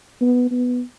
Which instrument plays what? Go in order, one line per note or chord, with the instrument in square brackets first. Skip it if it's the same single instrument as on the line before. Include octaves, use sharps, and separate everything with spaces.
[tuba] B3
B3